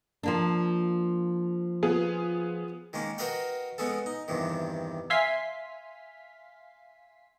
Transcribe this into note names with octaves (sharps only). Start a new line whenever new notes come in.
F3 A#3 D4
B3 F4 G#4
D#3 G#3 A#3 C#4
F#4 A#4 B4 D#5 F5 G5
G#3 B3 C#4 G#4 A4
D#4
E2 G2 C3 D#3
E5 F5 G#5 C6 B6 C7